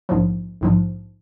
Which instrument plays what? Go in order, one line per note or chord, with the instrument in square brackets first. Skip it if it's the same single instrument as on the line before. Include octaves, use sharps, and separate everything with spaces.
[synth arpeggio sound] A#1 G#2 F3
A#1 G#2 F3